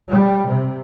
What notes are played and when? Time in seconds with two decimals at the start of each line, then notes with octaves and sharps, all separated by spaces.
0.11 G3
0.49 C3